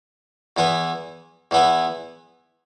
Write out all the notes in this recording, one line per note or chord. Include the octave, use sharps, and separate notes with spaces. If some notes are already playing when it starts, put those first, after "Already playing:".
E2 E3 B3 E4 B4
E2 E3 B3 E4 B4